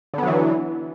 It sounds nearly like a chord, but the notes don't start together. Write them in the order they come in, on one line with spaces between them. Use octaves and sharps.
D3 B3 F#3 E3